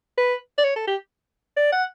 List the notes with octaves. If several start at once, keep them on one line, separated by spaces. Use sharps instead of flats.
B4
D5
C#5
A4
G4
D5
F#5